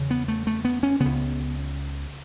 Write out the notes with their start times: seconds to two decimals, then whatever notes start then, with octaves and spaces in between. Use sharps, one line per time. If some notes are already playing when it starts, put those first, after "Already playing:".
Already playing: E2 C#3
0.11 B3
0.28 A3
0.47 A3
0.65 B3
0.83 C#4
1.00 C#2 C#3 B3